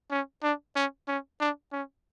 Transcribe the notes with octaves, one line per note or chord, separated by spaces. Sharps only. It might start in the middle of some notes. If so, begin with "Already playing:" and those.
C#4
D4
C#4
C#4
D4
C#4